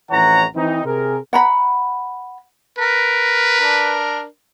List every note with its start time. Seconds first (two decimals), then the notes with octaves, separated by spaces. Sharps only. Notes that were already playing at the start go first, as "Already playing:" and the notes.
0.11 A1 F2 E3 C#5 F#5 A#5
0.56 E3 C4 D#4
0.85 C3 G#4 A#4
1.33 F#5 A#5 B5
2.78 A#4 B4
3.60 D4 A#4